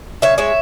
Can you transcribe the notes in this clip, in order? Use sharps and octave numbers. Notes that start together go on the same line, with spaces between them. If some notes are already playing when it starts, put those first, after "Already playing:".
C#3 C#5 E5
G#3 C#5 E5